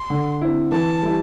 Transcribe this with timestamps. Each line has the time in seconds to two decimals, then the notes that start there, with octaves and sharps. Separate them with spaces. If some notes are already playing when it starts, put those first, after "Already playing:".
Already playing: C6
0.10 D3
0.41 C4 E4
0.72 E3 A5
1.03 G3 E4